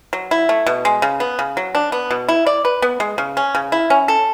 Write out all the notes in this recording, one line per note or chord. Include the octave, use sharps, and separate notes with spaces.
F#3
E4
A3
B2
G#3
C#3
B3
C#3
F#3
D4
B3
B2
E4
D5
B4
B3
G#3
C#3
C#4
C#3
E4
C#4
A4